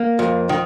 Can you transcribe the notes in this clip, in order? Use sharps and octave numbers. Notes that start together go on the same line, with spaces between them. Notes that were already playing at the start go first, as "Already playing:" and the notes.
Already playing: A#3
F2
D#3